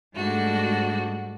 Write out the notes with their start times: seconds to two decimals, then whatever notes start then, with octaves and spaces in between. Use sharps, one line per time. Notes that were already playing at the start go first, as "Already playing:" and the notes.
0.15 G#2 G3 A3 D4 F#4